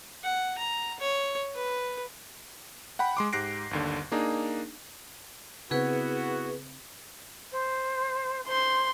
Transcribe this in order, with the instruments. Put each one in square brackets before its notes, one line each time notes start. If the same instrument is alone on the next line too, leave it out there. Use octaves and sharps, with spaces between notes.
[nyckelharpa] F#5
A#5
C#5
B4
[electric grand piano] F#5 G5 B5
G#3 C6 D6
G#2 G4 F#6 A#6 C7 D7
G1 D#2 D3
A#3 D4 D#4 G#4
[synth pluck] C#3 C4 [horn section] B3 E4 F#4 [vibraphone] G#4 B4
[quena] C5
[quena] C5 [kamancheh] C6